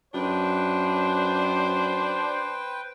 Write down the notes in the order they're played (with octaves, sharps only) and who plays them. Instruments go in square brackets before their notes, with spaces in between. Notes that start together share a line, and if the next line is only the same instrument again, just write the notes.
[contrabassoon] F#2 [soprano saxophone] D4 [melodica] B4 G5 [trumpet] C5